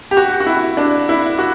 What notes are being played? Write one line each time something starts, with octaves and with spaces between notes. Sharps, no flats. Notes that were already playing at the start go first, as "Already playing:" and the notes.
G4
F#4
F#4
E4
D4
E4
F#4